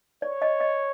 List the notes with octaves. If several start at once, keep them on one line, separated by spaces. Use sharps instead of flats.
C#5 D5
D#5
D#5